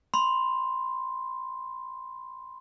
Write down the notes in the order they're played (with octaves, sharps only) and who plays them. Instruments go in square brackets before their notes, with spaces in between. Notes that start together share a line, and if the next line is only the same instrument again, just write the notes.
[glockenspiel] B5 C6